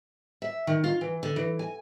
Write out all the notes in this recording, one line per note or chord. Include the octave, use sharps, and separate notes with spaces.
E5
D#3
F4
E3
D3
E3
G#5